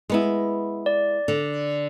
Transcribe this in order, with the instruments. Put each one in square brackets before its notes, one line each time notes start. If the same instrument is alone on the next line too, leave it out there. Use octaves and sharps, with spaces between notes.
[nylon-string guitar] G#3 B3 E4
[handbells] D5
[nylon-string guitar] D3